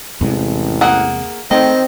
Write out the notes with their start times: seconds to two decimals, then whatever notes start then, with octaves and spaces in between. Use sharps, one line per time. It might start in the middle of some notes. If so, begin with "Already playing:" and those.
0.21 A1 E2 C3 G#3
0.81 A#3 G#4 F#5
1.51 D#3 A3 C4 D#5